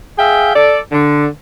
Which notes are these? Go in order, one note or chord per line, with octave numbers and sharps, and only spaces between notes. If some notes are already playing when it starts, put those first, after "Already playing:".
G#4 E5 F5 G5
A4 D5
D3